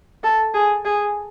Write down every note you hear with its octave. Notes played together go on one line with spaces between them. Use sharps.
A4
G#4
G#4